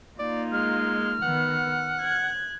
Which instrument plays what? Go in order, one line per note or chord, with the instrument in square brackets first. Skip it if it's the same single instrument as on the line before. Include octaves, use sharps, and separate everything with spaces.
[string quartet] A#3 D#4 F4 [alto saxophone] D5
[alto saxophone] G#3 [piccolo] F6
[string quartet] D#3 B3 [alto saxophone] F#5
[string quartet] F#6 G#6